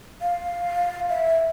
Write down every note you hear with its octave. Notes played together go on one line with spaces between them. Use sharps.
F5
E5